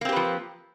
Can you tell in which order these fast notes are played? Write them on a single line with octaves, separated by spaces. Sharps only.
A#3 C4 G4 B4 F3